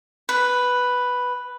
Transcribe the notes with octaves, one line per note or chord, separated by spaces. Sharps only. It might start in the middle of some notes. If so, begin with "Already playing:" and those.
B4